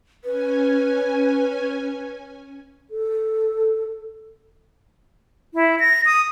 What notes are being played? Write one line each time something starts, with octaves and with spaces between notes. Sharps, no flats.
C#4 B4 G#5
A4
E4
A#6
D#6